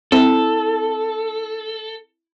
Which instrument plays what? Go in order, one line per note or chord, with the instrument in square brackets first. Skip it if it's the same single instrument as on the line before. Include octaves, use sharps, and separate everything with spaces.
[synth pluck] C4 E4 [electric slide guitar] A4